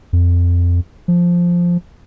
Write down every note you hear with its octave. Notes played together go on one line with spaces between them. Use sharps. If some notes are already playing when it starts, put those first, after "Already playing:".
F2
F3